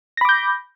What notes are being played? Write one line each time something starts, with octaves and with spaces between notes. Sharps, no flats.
B5 D6 G6 A#6